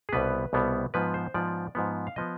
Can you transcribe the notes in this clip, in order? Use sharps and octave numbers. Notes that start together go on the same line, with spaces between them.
G#4
C2 B2 G3 B3 B4
C2 B2 G3 B3
G#2 F3 B3 B4
C5
G#2 F3 B3 D5
G#2 F3 B3
F5
F3 B3 D#5